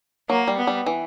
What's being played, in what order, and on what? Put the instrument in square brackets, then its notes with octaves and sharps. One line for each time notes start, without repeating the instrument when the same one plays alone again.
[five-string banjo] F#3 [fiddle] A#3
[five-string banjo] G3
[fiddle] B3
[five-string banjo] G3
E3